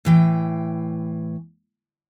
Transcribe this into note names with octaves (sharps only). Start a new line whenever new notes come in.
A2 E3 G5